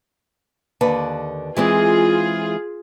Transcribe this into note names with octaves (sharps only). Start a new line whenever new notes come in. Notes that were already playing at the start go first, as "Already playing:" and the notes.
D#2 D3 B4
E3 G#3 C4 F4 G#4